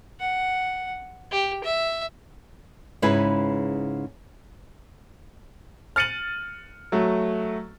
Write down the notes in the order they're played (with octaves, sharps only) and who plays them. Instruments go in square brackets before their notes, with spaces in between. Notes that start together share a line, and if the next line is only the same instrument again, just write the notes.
[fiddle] F#5
G4
E5
[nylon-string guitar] G#2 C#3 E4 B4 G#5
[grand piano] F6 A6 C#7 D#7 F#7
F#3 A3